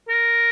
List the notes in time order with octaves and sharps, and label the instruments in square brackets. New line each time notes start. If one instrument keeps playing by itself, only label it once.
[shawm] A#4